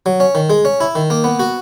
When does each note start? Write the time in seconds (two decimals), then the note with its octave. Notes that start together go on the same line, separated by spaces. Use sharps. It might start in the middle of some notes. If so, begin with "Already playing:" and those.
0.06 F#3
0.20 C#4
0.35 D#3
0.50 G#3
0.65 C#4
0.81 E4
0.95 D#3
1.10 A#3
1.24 B3
1.39 F#4